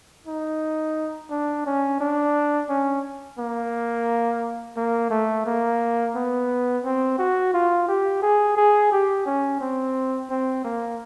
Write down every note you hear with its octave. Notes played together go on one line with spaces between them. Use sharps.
D#4
D4
C#4
D4
C#4
A#3
A#3
A3
A#3
B3
C4
F#4
F4
G4
G#4
G#4
G4
C#4
C4
C4
A#3